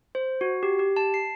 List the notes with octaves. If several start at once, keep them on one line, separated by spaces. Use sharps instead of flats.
C5
F#4
G4
G4
A5
C7